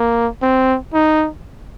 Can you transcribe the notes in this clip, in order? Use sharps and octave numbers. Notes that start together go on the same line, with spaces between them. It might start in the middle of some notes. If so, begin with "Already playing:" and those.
Already playing: A#3
C4
D#4